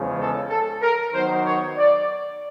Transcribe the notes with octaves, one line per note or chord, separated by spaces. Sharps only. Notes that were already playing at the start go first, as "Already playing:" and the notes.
Already playing: E2 C#3 F3 G#3
A4
A4
A#4
D#3 F#3 B3 D#4 C5
C#5
D5